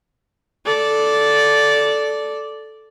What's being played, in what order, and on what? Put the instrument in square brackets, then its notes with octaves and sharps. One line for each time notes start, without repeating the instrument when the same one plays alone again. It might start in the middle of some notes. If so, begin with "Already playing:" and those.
[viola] A4 D5